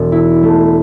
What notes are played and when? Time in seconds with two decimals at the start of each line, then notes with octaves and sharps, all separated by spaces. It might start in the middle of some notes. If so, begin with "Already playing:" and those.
Already playing: E1 E3
0.12 E4
0.43 A3